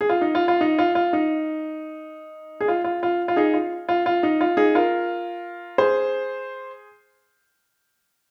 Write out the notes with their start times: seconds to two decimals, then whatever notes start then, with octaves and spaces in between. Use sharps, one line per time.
0.01 G#4
0.09 F4
0.21 D#4
0.35 F4
0.48 F4
0.61 D#4
0.79 F4
0.95 F4
1.13 D#4
2.61 G#4
2.68 F4
2.84 F4
3.03 F4
3.28 F4
3.36 D#4 G#4
3.54 F4
3.89 F4
4.06 F4
4.23 D#4
4.41 F4
4.57 D#4 G#4
4.75 F4 A#4
5.78 G#4 C5